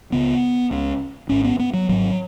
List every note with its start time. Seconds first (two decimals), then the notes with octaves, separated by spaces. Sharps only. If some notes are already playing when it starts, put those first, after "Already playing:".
0.12 C#2 C#3 B3
0.71 C#2 C#3
1.29 G#1 G#2 C#4
1.45 B3
1.59 B3
1.74 F#3
1.89 G#1 G#2 F#3